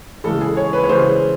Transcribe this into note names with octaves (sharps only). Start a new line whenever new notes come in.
C#3 E3 G#3 A4
G#4
C#5
B4
C#5
C#3 E3 G#3 C5